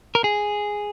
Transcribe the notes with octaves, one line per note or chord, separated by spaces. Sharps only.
A#4
G#4